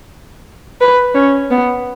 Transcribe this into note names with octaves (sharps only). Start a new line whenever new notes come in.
B4
C#4
B3